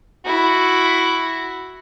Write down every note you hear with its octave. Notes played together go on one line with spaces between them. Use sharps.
E4 F#4